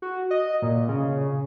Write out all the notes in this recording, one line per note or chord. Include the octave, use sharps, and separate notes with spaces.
F#4
D#5
A#2
C#3